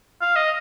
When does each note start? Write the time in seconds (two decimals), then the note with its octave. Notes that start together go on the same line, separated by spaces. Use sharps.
0.22 F5
0.36 D#5